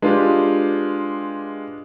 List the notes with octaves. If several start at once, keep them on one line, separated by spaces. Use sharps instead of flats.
G#3 D4 F4 G4 B4